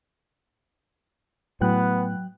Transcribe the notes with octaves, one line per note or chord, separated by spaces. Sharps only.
A2 F#3 B3 G5 F#6